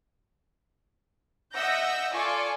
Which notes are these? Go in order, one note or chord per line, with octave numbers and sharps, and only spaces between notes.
D#5 E5 F#5 E6 G6 A#6
F4 A4 D5 G#5 C#6